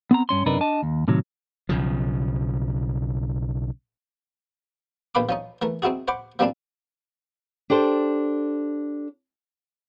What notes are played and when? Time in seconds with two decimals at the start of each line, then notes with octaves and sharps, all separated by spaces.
0.11 B3 C4 A#5
0.29 G2 C#4 C6
0.46 F#2 C3 D4 D#4 A#4 B4
0.60 D4 D#5 A5
0.82 D#2
1.08 A2 C3 D#3 F#3
1.69 B1 C#3 F3
5.15 A#1 D#3 B4 F5 B5 D6
5.29 F3 C#4 D#4
5.62 E3 A3 A#4
5.82 C4 D#4 E4 F#4 G#4
6.08 C5 F#5 B5 C#6 D6
6.39 F3 G3 A#3 C4 D4 F4
7.70 D4 G4 A4 C5